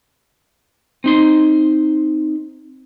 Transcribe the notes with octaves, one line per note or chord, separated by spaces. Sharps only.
C4 D#4 C6